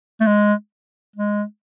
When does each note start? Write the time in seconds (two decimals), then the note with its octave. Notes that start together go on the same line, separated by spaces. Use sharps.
0.20 A3
0.26 G#3
1.16 G#3